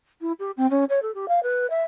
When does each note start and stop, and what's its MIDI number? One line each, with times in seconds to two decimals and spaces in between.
0.21 0.32 64
0.39 0.51 67
0.57 0.69 60
0.70 0.84 61
0.89 1.02 73
1.02 1.13 69
1.14 1.28 67
1.28 1.42 77
1.43 1.67 71
1.70 1.83 76